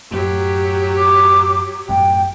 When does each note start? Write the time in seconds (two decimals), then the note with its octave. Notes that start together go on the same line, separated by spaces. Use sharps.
0.11 F#2 A2 F#3 G4
0.98 D6
1.88 G#1 F#2 A2 G5